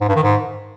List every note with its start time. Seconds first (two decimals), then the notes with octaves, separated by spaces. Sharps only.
0.01 G#2
0.08 G2
0.16 D#3
0.23 G#2